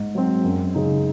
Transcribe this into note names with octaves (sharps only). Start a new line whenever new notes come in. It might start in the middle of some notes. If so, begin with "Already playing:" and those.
Already playing: G#2
F#3 C4
F#2
C#3 G#3 D#4